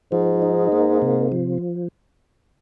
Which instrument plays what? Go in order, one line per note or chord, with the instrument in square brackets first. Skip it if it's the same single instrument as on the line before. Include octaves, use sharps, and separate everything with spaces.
[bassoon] G#2 [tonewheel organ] F3
[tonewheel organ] D#4
A#3
C3
F3